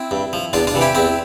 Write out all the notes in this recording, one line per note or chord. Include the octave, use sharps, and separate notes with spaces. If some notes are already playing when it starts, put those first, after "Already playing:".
Already playing: C4 E4
G2
F3
E2 D4 F4
D4 F4
C3 E3
E4 G4
E2 C4 E4